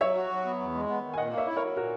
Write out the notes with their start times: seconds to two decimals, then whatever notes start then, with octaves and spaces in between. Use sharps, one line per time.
0.01 F#3 C#5 E5
0.16 F#4
0.30 F#3
0.45 B3
0.59 E2
0.74 G#3
0.88 B3
1.03 D#3
1.14 G#5
1.18 A#2 D#5 F#5
1.32 A#3
1.37 C#5 E5
1.47 E4
1.56 F#3 A#4 C#5
1.76 A#2 F#4 A#4